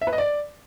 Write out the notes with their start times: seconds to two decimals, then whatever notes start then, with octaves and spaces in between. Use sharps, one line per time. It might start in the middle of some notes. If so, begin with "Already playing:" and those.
0.02 E5
0.07 B4
0.13 D#5
0.18 D5